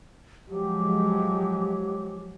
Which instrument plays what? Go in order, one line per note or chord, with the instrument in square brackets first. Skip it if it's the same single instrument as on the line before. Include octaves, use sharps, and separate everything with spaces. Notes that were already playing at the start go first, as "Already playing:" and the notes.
[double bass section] F3 F#3 G#3 [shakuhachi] G4